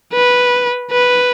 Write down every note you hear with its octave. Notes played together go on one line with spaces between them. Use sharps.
B4
B4